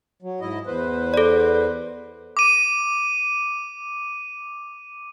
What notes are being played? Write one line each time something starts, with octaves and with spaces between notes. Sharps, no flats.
F#3
G#2 E4 D#5
E2 B4 C5
A4 D5
D6 D#7